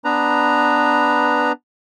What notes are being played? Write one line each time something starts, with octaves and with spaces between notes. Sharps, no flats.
B3 D4 B4 A#5